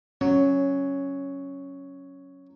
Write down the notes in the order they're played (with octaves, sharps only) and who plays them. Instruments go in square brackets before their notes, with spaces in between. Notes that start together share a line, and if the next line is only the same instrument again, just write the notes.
[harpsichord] F#3 [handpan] C#4